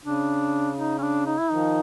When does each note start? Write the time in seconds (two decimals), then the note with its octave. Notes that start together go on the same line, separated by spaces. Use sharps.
0.05 C#3 D4
0.78 D#4
0.98 C#4
1.02 D4
1.26 D#4
1.38 E4
1.50 D#3 F3 D#4